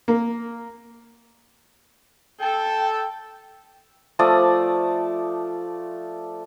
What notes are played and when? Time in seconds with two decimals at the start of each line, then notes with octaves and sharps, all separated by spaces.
0.08 A#3
2.40 A4 G5
4.19 F3 A3 D5 D#6